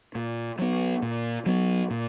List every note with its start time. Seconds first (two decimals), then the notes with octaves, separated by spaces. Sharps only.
0.15 A#2
0.59 F#3 B3
1.02 A#2
1.46 F#3 B3
1.91 A#2